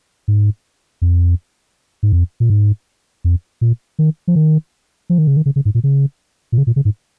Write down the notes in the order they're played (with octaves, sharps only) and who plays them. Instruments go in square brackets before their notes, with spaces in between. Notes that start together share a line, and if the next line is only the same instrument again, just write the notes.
[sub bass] G#2
F2
G#2
F2
A#2
G#2
F2
A#2
D#3
F3
D#3
F3
D#3
C#3
D#3
C#3
C#3
G#2
A#2
C#3
A#2
C#3
A#2
C#3
G#2